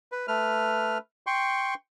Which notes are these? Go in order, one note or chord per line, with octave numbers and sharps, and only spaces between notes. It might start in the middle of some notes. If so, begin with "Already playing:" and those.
B4
A3 B4 F6
G5 C6 C#6